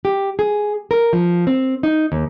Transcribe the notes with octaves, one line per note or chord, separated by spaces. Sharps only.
G4
G#4
A#4
F3
C4
D#4
D#2